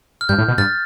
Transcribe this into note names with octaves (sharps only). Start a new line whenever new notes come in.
F6
G2 G6
A2
B2
G2 F6 A6